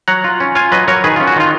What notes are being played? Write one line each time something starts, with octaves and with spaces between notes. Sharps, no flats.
F#3 F#5 A#5
F4
C#4
F4 F5 G#5
F#3 B4 D#5
F#3 A#4 C#5
D#3 G#4 B4
C#4 F4
F#4
D#3 F4